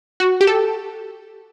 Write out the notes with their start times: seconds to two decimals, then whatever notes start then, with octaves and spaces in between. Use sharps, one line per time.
0.20 F#4
0.41 G4
0.47 A4